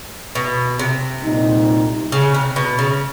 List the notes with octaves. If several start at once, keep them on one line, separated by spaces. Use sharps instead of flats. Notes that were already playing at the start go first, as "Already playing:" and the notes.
B2
C3
C2 A#2 G3 C4 D#4
C#3
C3
B2
C#3